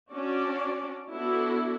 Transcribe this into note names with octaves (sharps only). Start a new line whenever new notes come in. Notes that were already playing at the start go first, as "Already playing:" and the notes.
C#4 D4 F#4 D5
B3 D4 E4 F#4 A4